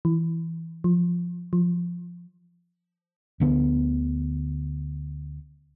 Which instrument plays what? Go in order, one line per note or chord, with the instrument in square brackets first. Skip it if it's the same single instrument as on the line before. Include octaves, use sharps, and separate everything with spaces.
[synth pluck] E3
F3
F3
[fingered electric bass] D2 D3 B3